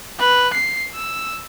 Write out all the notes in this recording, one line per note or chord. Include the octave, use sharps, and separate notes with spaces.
B4
C7
E6